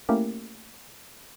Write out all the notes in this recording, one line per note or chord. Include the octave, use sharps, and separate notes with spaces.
A3 A#3 C#4 E4 G4 A#4